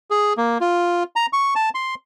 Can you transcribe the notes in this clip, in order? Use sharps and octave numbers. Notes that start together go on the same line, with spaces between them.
G#4
A#3
F4
A#5
C#6
A5
C6